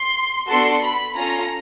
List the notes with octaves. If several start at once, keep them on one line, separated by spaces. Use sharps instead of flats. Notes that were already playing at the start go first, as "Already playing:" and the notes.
Already playing: C6
B3 D4 F#4 A4 C6
B5
C#4 F4 A4 A#5